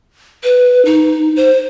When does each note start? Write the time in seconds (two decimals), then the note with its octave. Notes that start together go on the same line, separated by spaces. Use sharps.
0.44 B4
0.85 D#4
1.36 C5